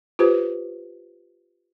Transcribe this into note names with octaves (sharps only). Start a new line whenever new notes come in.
F4 G4 B4 C5